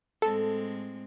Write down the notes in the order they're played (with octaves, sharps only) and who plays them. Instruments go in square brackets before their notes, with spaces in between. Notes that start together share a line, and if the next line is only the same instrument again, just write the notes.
[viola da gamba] A2 G#3 C4 [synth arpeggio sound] A4